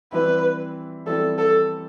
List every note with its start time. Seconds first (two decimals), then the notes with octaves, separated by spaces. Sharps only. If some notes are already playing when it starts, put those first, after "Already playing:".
0.12 E3 G3 C4 E4 B4
1.06 E3 G3 C4 E4 A4
1.38 A4